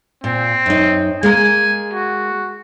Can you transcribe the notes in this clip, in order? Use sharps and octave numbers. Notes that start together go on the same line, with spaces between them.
A#2 C4
F#2 D#4
G#3 A#3 A#4 G#5
F#4